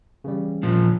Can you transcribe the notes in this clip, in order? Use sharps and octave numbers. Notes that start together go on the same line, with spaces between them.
C#3 E3 G3
A#2 F3